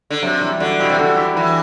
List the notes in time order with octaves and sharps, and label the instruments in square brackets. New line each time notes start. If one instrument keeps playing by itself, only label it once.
[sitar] D3
[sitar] C3 [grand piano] F#3
[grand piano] E3 G3
[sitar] D3 [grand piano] D4 F#4
[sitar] B2 [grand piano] E4 G4
[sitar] C3
[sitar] D3 [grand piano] F#4 A4
[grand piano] E4 G4
[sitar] E3 [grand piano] G4 B4